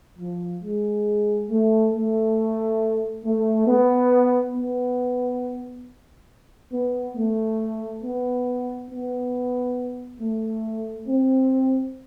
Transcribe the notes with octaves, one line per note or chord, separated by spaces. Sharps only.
F3
G#3
A3
A3
A3
B3
B3
B3
A3
B3
B3
A3
C4